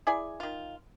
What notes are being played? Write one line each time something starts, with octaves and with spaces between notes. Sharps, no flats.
E4 G#4 D5 G#5
D#3 F4